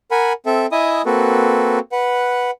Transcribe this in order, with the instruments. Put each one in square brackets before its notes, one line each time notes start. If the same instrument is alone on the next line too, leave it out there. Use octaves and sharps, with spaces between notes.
[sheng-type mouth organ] A#4 F#5 G#5 B5
C4 A4 E5
E4 D#5 E5 G#5 D#6
A#3 C4 F#4 A4 B4
B4 F#5